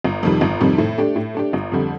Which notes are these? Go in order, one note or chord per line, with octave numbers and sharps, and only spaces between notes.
G1
F2 C3 D#3 G3
G1
F2 C3 D#3 G3
A2
A3 D4 G4
A2
A3 D4 G4
G1
F2 D3 G3